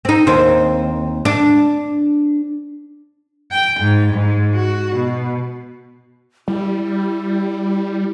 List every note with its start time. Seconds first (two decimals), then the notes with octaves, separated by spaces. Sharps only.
0.05 C4 D#4
0.27 D#2 C4
1.25 D4
3.52 G5
3.80 G#2
4.14 G#2
4.55 F#4
4.96 B2
6.48 G3 E4